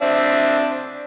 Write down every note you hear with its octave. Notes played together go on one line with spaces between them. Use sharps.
C4 D4 E5